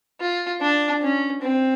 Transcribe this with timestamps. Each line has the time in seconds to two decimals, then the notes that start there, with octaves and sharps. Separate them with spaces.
0.21 F4
0.62 D4
1.02 C#4
1.42 C4